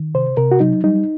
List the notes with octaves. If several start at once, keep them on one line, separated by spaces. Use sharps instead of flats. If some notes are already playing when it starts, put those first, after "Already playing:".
Already playing: D#3
C3 C5
C3 A#4
F#4
F#3 D#4
G3 D#4